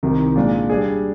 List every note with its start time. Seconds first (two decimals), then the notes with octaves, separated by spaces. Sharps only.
0.03 C2 C3 D#3
0.35 A#2 G#3 D4
0.70 G3 D4 G#4